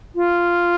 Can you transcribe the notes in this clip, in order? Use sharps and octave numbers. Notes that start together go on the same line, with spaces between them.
F4